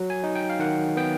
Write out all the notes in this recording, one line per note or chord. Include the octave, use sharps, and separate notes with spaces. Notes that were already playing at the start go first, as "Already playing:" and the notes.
Already playing: F#3
G#5
D#4
G5
F5
D#3 F#5
B3 G5